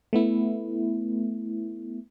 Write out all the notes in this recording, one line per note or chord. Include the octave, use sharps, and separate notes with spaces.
A3 B3 E4